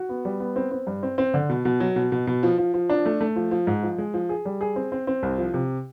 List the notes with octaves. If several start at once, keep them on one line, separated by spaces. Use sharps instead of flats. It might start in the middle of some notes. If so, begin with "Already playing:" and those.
Already playing: F#4
B3
G3
B3
C4
C4
G2
C4
C4
D3
B2
B2
F#3
B2
B2
B2
F3
F3
F3
D4
A3
A3
F3
F3
G#2
F3
G#3
F3
G#4
G3
G#4
C4
C4
C4
C2
F3
C3